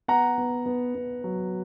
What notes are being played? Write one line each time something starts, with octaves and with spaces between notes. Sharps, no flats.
B3 F#5 A#5
B3
B3
B3
F#3